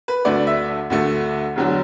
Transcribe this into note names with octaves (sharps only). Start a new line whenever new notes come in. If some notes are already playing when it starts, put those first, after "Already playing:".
B4
D2 D3 A3 D5
E5
D2 D3 A3
E1 E2 D3 F#3